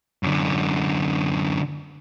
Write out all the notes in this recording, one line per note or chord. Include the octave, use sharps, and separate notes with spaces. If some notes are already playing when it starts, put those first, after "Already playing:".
F#2 D3